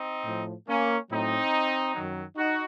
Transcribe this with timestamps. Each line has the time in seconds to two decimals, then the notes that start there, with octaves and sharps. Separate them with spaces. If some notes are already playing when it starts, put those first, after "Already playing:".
Already playing: C4 D#4
0.25 A2 F3
0.67 A#3 C#4
1.09 A2 F#3 C4 D#4
1.94 F#2 D#3 F#3
2.36 D#4 F#4